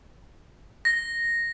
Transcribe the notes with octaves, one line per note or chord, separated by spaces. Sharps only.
A#6